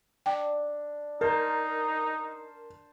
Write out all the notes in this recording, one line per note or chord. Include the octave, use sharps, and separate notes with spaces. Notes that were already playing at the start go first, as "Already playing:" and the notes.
D4 G5
D#4 A#4 C5 A5